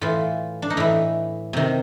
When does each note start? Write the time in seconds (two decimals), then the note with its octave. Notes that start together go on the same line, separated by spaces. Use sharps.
0.01 A2 E3 F4
0.62 D4
0.70 D#4
0.77 A2 E3 E4
1.53 C3 D#3